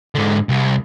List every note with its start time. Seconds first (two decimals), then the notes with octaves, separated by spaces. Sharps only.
0.15 G#2 D3
0.49 C2